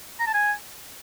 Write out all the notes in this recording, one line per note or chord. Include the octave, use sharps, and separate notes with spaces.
A#5
A5
G#5